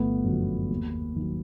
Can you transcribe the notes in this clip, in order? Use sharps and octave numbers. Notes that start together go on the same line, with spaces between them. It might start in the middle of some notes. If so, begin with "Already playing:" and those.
Already playing: G1 A3 B3
F#2 D3 F3
D#2
D#3 F#3